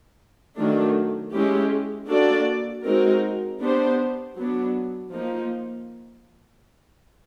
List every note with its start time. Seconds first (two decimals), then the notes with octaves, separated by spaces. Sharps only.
0.56 D#3 F#3 A3 D4
1.31 G#3 C#4 E4 G4
2.08 A#3 D4 F#4 A4 D5
2.84 G#3 C4 D#4 F#4 A#4
3.62 B3 D4 G4 C5
4.38 F#3 B3 D4
5.14 F3 A#3 D#4